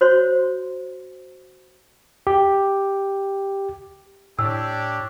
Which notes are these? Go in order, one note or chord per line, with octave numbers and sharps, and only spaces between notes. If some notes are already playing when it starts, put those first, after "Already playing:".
F#4 C5 C#5 C6
G4
A2 D4 G4 C#5 E6